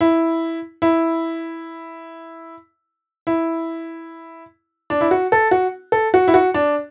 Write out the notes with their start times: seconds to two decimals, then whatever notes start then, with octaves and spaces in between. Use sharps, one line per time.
0.01 E4
0.82 E4
3.27 E4
4.90 D4
5.01 E4
5.11 F#4
5.32 A4
5.51 F#4
5.92 A4
6.14 F#4
6.28 E4
6.34 F#4
6.54 D4